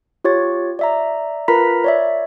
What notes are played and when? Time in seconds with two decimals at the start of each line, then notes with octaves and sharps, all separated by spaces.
0.24 F4 G4 C#5 C#6 A6
0.79 D5 E5 A#5
1.48 F4 A#4 B4 A#5 B5 B6
1.84 C#5 D5 E5